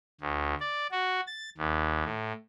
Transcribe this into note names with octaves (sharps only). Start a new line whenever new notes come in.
D2
D5
F#4
A6
D#2
A2